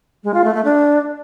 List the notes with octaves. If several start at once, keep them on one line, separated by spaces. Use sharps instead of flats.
G#3
F4
A3
A3
D4